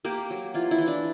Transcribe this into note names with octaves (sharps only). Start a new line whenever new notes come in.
A#3 G4
F#3
E3 F4
E4
E3
D4